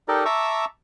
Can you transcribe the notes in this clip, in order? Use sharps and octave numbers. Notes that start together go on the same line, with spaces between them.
D#4 G4 A4 A#4 D5 D#5
E5 A5 A#5 C#6 D6 E6